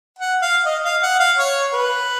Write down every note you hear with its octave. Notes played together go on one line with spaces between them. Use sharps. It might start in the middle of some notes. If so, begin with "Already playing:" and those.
F#5
F5
D#5
F5
F#5
F5
C#5
B4